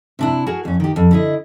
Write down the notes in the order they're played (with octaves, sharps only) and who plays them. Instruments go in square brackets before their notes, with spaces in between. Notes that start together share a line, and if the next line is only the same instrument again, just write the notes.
[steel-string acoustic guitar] C3 D4 E4
F#4 G#4 A#4
F2 C#4
D#3 G4
F2
D3 E4 D#5